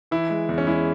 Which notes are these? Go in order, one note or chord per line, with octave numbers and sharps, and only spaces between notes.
E3 E4
G#3
E2
C#4
G#3 E4